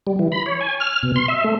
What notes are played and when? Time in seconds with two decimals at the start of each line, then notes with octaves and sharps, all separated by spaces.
0.07 G3
0.19 E3
0.32 B5
0.46 C#5
0.61 G#5
0.80 F6
1.03 B2
1.16 C6
1.28 E5
1.44 A3